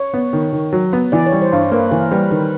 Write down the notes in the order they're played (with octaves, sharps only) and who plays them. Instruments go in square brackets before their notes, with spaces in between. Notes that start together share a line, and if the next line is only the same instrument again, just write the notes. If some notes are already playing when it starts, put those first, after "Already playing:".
Already playing: [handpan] C#5
[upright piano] B3
D#3
D#3
F#3
B3
[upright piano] E3 [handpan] D5
[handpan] C#5
[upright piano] G3
[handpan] C5
[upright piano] G2 [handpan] C5
[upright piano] A#3 [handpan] B4
[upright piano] E3 [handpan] A#4
[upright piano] G3 [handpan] B4
[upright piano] D#3 [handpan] B4